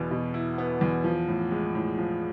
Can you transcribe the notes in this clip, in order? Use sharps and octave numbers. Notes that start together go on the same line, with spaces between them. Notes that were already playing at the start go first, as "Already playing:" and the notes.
Already playing: E2 B2 B3
B2
E4
B3
E2
F3
A2
G#3
A2
F3